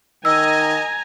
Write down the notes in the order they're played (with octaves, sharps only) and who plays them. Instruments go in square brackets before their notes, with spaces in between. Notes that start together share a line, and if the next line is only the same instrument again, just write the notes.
[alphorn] D#3 [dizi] D#5 [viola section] G#5 A#5 [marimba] E6